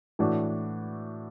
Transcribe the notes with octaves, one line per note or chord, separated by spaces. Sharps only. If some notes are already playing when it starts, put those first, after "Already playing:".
A2 E3 D4 F#4